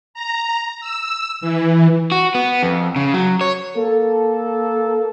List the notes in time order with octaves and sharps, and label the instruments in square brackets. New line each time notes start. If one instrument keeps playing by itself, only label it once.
[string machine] A#5
E6
E3
[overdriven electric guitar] F#4
B3
F2
C#3
F#3
C#5
[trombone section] A#3 A4